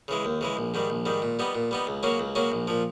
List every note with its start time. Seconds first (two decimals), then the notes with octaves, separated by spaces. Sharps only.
0.08 C#3 E3 G#3
0.25 D#2
0.41 C#3 E3 G#3
0.57 A#1
0.74 G#2 D#3 G3
0.90 A#1
1.05 G#2 D#3 G3
1.22 A#2
1.39 G3 B3 D#4
1.55 A#2
1.71 G3 B3 D#4
1.87 C#2
2.03 C#3 F#3 A#3 C#4
2.19 C#2
2.35 C#3 F#3 A#3 C#4
2.52 A#1
2.68 A#2 F3